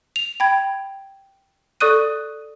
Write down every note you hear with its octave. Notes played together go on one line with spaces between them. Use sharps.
F7
G5 B5 G#6
A4 D5 C#6 D#6 F#6 D#7